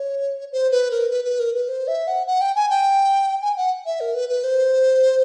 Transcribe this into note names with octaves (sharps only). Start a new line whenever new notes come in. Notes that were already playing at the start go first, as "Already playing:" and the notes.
Already playing: C#5
C5
B4
A#4
B4
B4
A#4
B4
C5
E5
F#5
F#5
G5
G#5
G5
G#5
F#5
E5
A#4
B4
B4
C5